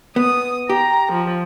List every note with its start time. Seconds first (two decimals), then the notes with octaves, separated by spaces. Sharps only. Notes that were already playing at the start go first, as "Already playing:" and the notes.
0.16 B3 D#6
0.70 G4 A#5
1.12 F3